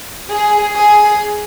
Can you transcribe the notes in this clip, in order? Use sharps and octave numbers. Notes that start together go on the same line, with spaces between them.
G#4
G#4